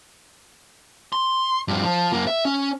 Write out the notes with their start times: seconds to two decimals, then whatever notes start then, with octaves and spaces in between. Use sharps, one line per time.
1.13 C6
1.68 G2 F3
1.84 F3
2.12 F#2 A#3
2.27 E5
2.45 C#4